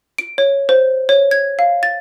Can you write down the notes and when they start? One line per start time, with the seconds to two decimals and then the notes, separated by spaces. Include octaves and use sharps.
0.18 D7
0.38 C#5
0.69 C5
1.09 C#5
1.31 G#6
1.59 F5
1.83 A6